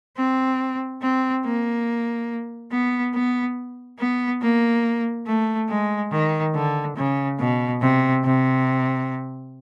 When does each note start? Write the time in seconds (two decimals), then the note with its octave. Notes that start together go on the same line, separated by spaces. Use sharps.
0.17 C4
1.02 C4
1.44 A#3
2.72 B3
3.14 B3
3.99 B3
4.42 A#3
5.27 A3
5.69 G#3
6.12 D#3
6.55 D3
6.96 C#3
7.40 B2
7.81 C3
8.24 C3